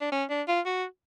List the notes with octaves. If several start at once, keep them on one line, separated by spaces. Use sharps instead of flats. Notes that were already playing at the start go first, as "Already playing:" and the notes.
D4
C#4
D4
F4
F#4